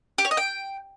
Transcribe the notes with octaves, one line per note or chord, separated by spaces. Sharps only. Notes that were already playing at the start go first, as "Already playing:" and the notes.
G4
C#5
D#5
G5